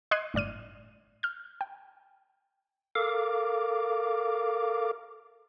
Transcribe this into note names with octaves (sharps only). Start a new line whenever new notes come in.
D#5 C6 F#6 G#6 C7 D#7
G1 A2 D5 F6 D#7
F6 G6
G5
A4 A#4 F5 D6